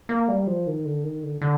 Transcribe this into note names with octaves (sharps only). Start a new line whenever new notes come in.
A#3
G3
F3
D#3
D3
D#3
D3
D3